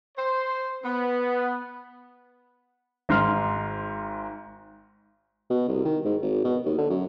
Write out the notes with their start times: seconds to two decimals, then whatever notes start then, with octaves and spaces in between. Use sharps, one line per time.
0.17 C5
0.84 B3
3.09 G#1 G#2 C6 F6
5.50 B2
5.68 C2
5.85 D#3
6.05 G#2
6.22 G#1
6.44 B2
6.65 D#2
6.78 D3
6.90 F#2